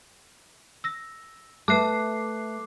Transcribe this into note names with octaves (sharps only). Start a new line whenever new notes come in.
E6 A#6
A3 B4 E5 A5 D6 F#6 C7